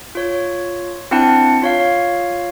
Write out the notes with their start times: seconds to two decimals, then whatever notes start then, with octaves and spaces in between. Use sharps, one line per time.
0.15 F4 C#5
1.11 C4 D4 E4 F#5 A5 C#7
1.62 F4 C#5 F5